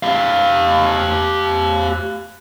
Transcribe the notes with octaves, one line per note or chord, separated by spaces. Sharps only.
G4 F5